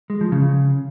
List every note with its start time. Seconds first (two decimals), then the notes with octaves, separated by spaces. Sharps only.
0.10 G#3
0.21 F3
0.32 C#3